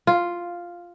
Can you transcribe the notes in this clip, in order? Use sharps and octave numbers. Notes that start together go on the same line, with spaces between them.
F4